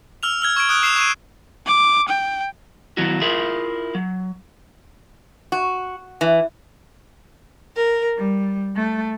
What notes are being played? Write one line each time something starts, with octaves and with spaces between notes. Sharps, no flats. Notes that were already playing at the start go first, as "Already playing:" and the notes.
E6 F6 F7
E6 F6 G#6
C#6 G#6 D7
D#6 F#6 D7
C#6 C7 E7 F7
C#6 C7 D#7
D6
G5
D#3 F#3 B3 E4 F#4
E4 F4 G#4 A#4 E5
F#3
F#4
E3
A#4
G3
A3